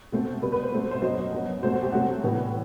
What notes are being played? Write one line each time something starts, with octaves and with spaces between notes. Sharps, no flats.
B2 A3 C4
B2 G3 C4 B4
B4
C5
B2 A3 C4
C5
F#2 F#3 B3 D#5
F#2 F#3 B3
B2 F#3 A3 C4 C5
F#4
G4
C3 F#3 A3 C4 F#4
A2 E3 G3 B3